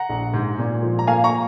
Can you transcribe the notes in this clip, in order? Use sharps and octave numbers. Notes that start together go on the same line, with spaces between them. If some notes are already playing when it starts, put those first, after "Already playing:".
Already playing: F#5 A#5
A#1
G#2
A#2
F3
A#5
A#3 F5 G#5
A#5 C#6